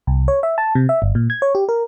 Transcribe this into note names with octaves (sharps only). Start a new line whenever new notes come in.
C2
C#5
E5
A5
C3
E5
G1
A#2
G#6
C#5
G4
A#4